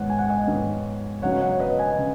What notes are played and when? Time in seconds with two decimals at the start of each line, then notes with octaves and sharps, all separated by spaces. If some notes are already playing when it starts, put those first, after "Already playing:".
Already playing: G#2 D#3 G#3 B3 C#5 F#5
0.10 G#5
0.19 F#5
0.29 D#5 G#5
0.47 G#2 D#3 G#3 B3
1.22 C#3 F#3 B3 D#4 C#5 F#5
1.41 C#5 F#5
1.60 B4 D#5
1.79 D#5 G#5
1.98 C#3